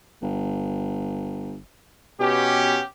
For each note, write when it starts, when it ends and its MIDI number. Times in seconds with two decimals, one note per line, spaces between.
0.22 1.58 31
2.20 2.78 47
2.20 2.82 59
2.20 2.82 61
2.20 2.82 67